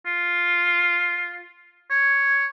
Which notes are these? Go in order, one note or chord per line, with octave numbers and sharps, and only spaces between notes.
F4
C#5